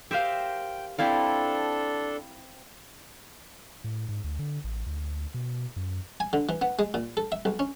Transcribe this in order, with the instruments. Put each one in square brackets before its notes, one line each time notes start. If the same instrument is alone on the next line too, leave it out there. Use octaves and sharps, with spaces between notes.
[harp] G4 F5 [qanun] A#4 C5 E5 [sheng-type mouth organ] G5
[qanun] C4 E4 D5 [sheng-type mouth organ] D4 A4 [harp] F5
[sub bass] A2
G#2
D2
D3
A1
D2
B2
F#2
[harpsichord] G#5
D3
E3
B3
G#3
A#2
A4
E5
B1
C#4